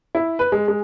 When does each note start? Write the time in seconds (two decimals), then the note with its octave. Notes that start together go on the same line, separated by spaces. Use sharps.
0.15 E4
0.39 B4
0.52 G#3
0.68 G#3